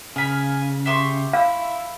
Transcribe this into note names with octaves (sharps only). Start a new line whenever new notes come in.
C#3 F5 G#5 B5
G4 E5 C6 C#6
E4 F5